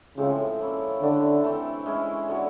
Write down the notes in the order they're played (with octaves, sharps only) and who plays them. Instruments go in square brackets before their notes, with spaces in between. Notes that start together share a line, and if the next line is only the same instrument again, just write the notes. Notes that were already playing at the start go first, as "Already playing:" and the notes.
[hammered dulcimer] A2 F3 G#3 C4 [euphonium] C#3
[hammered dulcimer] F3 A#3 C#4 E4
[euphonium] D3 [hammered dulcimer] A3 D4 G4
[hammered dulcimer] E3 A3 C4
G#3 C#4 E4
D3 F#3 B3